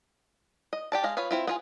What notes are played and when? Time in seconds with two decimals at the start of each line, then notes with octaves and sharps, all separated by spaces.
0.73 D#5
0.92 G4 D5 A5
1.04 G#3 D#5 F5
1.17 F4 B4 C#5 F5
1.31 C4 E4 F4
1.47 B3 F4 G#4